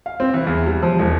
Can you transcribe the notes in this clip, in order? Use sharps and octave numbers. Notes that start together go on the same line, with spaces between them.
F5
C4
E3
E2
G3
F3
E1